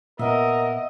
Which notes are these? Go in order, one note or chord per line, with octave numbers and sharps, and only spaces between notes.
A#2 B3 A#4 D#5 E5 F#5